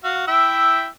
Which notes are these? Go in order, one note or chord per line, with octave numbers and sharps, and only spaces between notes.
F#4 F5
E4 E5 G5